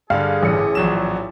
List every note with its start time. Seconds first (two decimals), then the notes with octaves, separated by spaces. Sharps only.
0.10 G2 D3 G#4 F5
0.43 A1 C#7
0.75 A#1 F#3 E7